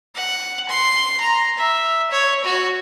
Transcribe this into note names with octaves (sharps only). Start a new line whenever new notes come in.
F#5
C6
A#5
E5
C#5
F#4